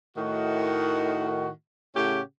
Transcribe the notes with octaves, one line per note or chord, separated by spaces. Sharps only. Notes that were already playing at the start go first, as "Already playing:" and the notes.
A2 D#3 F#4
A2 C#3 C#4 G4 F#5 G5